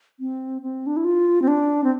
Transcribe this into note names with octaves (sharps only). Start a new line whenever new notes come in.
C4
C4
D4
E4
F4
C4
D4
C4